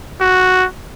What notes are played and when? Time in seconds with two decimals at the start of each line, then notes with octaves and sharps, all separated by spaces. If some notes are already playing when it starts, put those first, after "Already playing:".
0.21 F#4